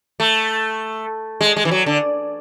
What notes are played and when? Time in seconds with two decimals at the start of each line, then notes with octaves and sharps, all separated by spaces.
0.20 A3
1.41 G#3
1.56 G#3
1.65 E3
1.71 F#3
1.86 D3